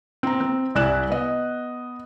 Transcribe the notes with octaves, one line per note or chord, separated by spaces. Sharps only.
C4 A#5
C4
C2 E4 D5 G#5 F#6 E7
B3 D#5